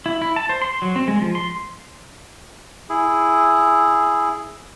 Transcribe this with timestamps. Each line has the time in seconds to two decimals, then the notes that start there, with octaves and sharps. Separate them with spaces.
0.06 E4
0.22 E4
0.36 A5
0.49 C5
0.62 C6
0.82 F#3
0.96 C4
1.08 G#3
1.22 F3
1.35 C6
2.89 E4 G#4